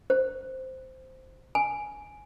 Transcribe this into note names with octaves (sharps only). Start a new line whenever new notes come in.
C5
G#5